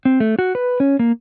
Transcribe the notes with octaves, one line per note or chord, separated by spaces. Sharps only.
C4
A3
F#4
B4
C#4
A#3